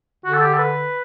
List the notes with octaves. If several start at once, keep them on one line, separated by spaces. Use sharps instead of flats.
D3 F#4
A4
G4
A4
B4